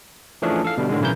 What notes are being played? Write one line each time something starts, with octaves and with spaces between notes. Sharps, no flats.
E3 F3 A3 C#4 D4 G#4
A4 F5
B2 D3 G3
A2 D3 D#3 G#3
B1 C#3 E3 E4 A#4 G6